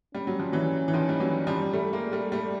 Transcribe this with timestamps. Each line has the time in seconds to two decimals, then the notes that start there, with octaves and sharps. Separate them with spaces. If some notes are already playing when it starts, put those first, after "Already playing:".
0.15 G3 C#4
0.27 F#3
0.39 F3
0.52 E3 F#3
0.88 E3
0.93 D#3 F3
1.09 G3
1.20 E3 F#3
1.47 F3 G3
1.73 G3 A3
1.93 G#3 A#3
2.12 G3 A3
2.32 G3 A3